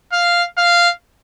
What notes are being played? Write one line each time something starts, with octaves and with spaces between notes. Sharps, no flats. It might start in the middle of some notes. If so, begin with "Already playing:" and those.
F5
F5